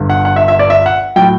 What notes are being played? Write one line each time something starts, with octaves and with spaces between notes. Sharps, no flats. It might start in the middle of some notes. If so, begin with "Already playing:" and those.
Already playing: G1 G2 D3
F#5
F#5
E5
E5
D5
E5
F#5
A2 F#3 G5